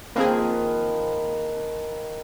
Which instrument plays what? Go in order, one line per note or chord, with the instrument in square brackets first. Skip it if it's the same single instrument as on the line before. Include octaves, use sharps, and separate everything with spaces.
[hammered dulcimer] D#3 F3 B4 [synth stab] A#3 C4 G#4